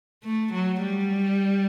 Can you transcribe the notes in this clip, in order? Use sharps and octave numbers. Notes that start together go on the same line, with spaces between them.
A3
F#3
G3